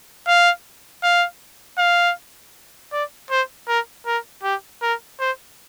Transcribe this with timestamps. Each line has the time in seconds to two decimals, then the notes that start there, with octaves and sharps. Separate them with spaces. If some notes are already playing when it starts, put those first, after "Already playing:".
0.27 F5
1.03 F5
1.78 F5
2.92 D5
3.30 C5
3.68 A#4
4.06 A#4
4.43 G4
4.82 A#4
5.20 C5